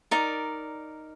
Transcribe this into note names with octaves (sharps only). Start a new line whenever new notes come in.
D#4 A#4 D5